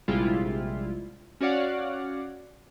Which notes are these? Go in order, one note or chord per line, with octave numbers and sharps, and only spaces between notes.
A#1 C3 G3 G#3 E4 F4
C#4 F#4 C#5 D5 F5 F#5